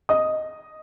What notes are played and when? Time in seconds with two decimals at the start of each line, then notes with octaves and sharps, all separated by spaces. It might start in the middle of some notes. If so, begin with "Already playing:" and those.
0.09 D#5 D#6